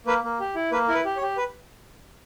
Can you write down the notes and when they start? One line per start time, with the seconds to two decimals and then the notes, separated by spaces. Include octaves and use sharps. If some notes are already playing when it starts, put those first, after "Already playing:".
0.06 A#3 B4
0.24 A#3
0.40 G4
0.55 E4
0.72 A#3 B4
0.88 E4 A#4
0.95 B4
1.05 G4
1.17 C#5
1.22 G4
1.37 B4